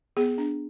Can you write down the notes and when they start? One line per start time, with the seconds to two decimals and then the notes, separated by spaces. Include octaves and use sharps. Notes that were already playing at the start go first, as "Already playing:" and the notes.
0.17 B3 G#4
0.38 D4